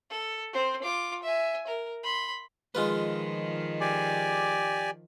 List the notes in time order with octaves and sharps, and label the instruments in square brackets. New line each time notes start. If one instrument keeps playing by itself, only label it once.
[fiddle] A4
C4 C5
F4 D6
E5 G#5
A#4
B5 C6
[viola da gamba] D#3 F3 [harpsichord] G#3 F4 B4
[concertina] G4 D5 G#5